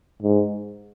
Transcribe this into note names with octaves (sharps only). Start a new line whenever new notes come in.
G#2